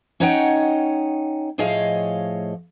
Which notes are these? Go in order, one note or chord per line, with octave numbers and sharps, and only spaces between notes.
C#4 D#4 C#5 D#5 F#5 G5
A2 F3 G#4 C#5 D#5 F5